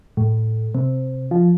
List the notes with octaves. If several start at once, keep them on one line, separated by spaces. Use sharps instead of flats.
A2
C3
F3